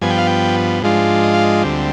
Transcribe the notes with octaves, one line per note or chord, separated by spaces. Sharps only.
G2 F3 B3 G#5
G5
F5
G5
G#2 F3 G#3 D4 F4
D#5
F5
D#5
D2 D3 G3 C4